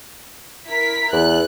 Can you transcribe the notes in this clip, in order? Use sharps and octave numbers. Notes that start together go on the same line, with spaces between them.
E4 A#4 B6
E2 F#6